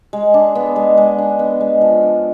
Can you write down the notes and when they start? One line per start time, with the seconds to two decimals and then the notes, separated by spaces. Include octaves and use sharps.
0.13 G#3
0.34 D4
0.55 B3
0.76 G#3
0.98 G#3
1.19 D4
1.39 B3
1.61 G#3
1.81 F3
2.03 D4